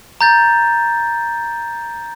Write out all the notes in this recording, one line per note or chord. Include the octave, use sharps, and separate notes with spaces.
A#5 G6 A6